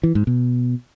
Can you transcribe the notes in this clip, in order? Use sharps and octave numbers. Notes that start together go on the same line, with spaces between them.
E3
G#2
B2